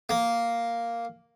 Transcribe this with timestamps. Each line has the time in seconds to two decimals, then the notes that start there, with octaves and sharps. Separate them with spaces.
0.09 A#3